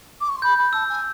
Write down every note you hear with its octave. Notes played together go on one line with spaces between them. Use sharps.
D6
C#6
C6
B5 G6
B5
A5 E6
G#5